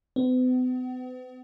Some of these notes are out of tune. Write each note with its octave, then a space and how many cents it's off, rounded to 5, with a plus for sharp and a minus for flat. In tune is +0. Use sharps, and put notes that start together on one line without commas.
B3 +45